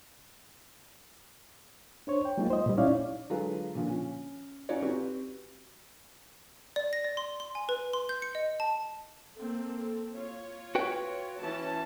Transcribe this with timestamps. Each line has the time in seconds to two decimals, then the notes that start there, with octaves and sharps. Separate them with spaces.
2.07 D4 C5 C#5
2.25 G5
2.38 F#3 G#3 A#3 D#4 F4
2.50 C5 D#5
2.66 A#2 G3
2.77 C#4 D#4 E4 C#5 D5 F5
3.30 D3 F#3 G#3 F4 A4 B4
3.75 A#2 D3 F3
3.87 C#4
4.69 C#4 D#4 F4 F#4 C#5 D5
4.82 C4 F#4 G4 B4
6.76 D5
6.93 A#6
7.04 D5
7.17 C6
7.40 C6
7.55 G#5
7.69 B4
7.93 C6
8.09 G6
8.22 C#7
8.35 D#5
8.60 A5
9.36 A#3 C4 A4
10.14 F4 C#5
10.75 F#4 B4 G5
11.41 E3 C#4 A5